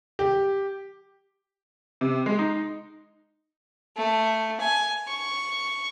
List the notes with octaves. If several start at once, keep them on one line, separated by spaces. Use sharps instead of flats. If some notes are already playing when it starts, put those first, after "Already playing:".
G4
C3
G#3
D#4
A3
G#5
C#6